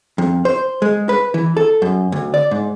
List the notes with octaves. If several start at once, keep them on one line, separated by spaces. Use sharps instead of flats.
F2
C5
G#3
B4
E3
A4
F#2
D2
D5
G#2